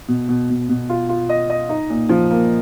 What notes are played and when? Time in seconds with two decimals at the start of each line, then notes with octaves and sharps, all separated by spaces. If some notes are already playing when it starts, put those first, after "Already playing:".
0.08 B2
0.29 B2
0.50 B2
0.69 B2
0.90 F4
1.09 F4
1.29 D#5
1.50 D#5
1.69 D#4
1.90 A#2
2.09 F3
2.31 A#3